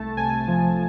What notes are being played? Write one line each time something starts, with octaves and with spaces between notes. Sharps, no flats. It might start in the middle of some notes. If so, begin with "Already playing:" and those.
Already playing: C2 A3 A5
C3 G#5
F3